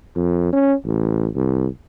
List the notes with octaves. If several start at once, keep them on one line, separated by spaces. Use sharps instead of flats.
F2
C#4
A1
C2